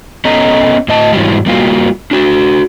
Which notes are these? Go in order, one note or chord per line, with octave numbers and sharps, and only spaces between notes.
B3 C#4 A4 D#5 A#5
A2 D#5 A5
G#2 E3 F#3 G3
G3 A#3 F4 F#4
D4 F#4